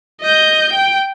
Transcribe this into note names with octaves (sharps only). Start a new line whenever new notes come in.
D#5 G6
G5